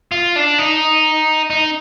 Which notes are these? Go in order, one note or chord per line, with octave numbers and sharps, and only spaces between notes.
F4
D4
D#4
D#4